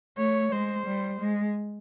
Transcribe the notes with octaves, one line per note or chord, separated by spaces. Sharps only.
A3 C#5
G#3 C5
G3
G#3